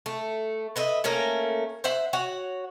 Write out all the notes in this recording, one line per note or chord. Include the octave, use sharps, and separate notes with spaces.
A3
B4 D#5 E5
A3 A#3 C#4 A#4
C5 E5 F#5
F#4 C#5 F#5